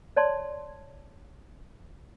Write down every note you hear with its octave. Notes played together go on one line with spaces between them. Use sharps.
C#5 D5 A5 C6